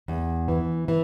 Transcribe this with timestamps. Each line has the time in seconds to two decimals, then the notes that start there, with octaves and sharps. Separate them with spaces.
0.08 E2
0.48 E3
0.88 E3